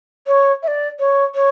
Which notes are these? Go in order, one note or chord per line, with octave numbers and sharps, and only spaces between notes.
C#5
E5
D5
C#5
C#5